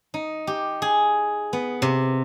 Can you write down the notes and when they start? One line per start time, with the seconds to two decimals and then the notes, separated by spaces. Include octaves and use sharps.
0.14 D#4
0.47 G4
0.82 G#4
1.53 B3
1.82 C3